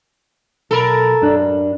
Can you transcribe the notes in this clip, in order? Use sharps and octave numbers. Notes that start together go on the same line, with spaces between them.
B1 A4 A#4 B5
F#2 D4